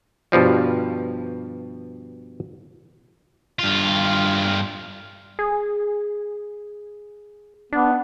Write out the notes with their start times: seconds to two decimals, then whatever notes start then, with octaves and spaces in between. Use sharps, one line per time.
0.32 G2 B2 F3 G3
3.59 G2 F4
5.39 G#4
7.73 B3 D4